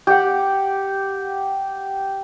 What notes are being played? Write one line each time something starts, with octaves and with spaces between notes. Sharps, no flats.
G4 F#5